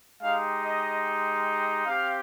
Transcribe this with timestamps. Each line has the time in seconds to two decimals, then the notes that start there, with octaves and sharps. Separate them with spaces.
0.22 G#3 D#4 G4 F5
0.63 D#5
1.86 C4 G4 F5